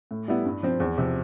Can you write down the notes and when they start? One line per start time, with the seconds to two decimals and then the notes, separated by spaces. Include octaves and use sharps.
0.11 A2
0.28 G3 B3 E4
0.45 G2
0.63 F3 C4
0.80 E2
0.97 C3 F3